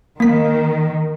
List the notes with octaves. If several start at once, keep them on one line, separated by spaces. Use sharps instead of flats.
D#3 A#3 B6